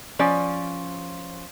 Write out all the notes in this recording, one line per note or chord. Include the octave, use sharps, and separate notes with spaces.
F3 C#4 D5